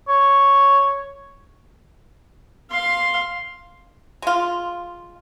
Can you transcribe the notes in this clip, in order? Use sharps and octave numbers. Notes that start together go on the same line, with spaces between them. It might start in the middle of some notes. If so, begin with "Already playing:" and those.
C#5
F5 C6
G#3 F4